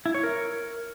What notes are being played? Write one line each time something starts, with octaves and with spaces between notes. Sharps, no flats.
E4
C#5
A#4